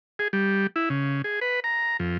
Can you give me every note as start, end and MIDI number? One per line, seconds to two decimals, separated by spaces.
0.19 0.28 68
0.33 0.67 55
0.76 0.89 64
0.90 1.22 49
1.24 1.40 68
1.41 1.60 71
1.64 1.97 82
1.99 2.18 41